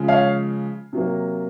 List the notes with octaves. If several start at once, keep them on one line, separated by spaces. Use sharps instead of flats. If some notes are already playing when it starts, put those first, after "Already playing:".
Already playing: C#3 F3 G#3
C#5 F5
C3 F#3 A#3